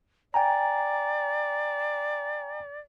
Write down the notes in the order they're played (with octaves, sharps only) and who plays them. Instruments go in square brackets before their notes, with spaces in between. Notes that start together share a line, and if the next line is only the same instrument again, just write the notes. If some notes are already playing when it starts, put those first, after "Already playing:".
[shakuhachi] D5 [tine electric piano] G5 G#5 A#5